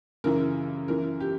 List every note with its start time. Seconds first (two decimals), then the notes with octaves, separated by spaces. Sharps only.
0.24 F#2 C#3 E3 A#4
0.88 F#2 E3 A#4
1.20 G4